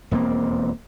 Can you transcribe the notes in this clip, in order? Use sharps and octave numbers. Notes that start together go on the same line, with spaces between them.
E1 F2 A#3 C4